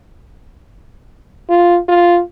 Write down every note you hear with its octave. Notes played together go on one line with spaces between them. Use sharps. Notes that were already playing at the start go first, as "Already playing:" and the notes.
F4
F4